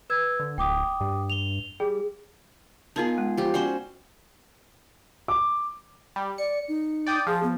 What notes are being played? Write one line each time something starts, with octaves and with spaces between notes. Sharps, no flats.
B4 E6 G#6
D3
D1 G5 D6 D#6
G2
F7 G7
G3 G#4
B3 D#4 F4 G#4 A#4 A5
G#3
F3 G4
C#4 F#4 C5 D5
D6
G3
D5 C#7
D#4
D5 G5 D#6
F3 G#4
B3